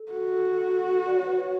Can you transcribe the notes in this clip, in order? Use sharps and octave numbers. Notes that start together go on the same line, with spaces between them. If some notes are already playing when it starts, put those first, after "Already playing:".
Already playing: A4
F#4
D5
C#5
B4
C#5